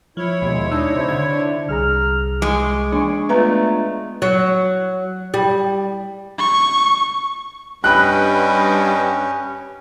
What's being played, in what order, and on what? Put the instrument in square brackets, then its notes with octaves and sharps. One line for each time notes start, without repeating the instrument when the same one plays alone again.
[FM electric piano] F3 [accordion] E4 C#5
[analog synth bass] D#2 [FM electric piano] B2 [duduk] G#3
[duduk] D4 [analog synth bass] D#4 [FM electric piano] E6
[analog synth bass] C3 [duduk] C5
[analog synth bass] D3 [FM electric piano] G#6
[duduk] D4
[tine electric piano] C2 G#4 A#5 [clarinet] F6
[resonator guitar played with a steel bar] G#3 [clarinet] D6
[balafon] E3 A#3 D4 [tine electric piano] G#5 C#6
[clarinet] A3 [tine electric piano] B3 D4 F4 [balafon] B4 E5 A#5
[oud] F#3
G3
[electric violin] C#6
[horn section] G2 [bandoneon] C#4 [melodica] B4 D#5 G5 [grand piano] B5 F#6